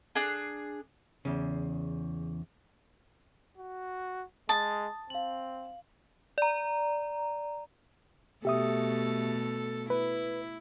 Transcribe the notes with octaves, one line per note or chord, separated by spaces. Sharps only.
D4 G#4
E2 C#3
F#4
G#3 A5 D#6
C4 F5 F#7
D5 A#5
B2 A3 G4 A4 E5 D#6
E4 B4